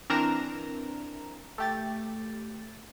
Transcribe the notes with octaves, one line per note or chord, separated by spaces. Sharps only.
E3 C4 D4 A#4 A#5 E7
A3 G4 A6